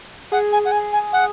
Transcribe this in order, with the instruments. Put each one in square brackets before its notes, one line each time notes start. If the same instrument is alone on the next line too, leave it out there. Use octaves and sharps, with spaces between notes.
[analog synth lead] G#4 [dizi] F#5
[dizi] G#5
F#5
G#5
G#5
F#5